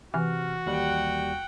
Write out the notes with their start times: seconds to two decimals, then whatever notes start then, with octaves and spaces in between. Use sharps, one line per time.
0.14 C3 E3 F#4 F6
0.66 D#2 G3 F#5 G5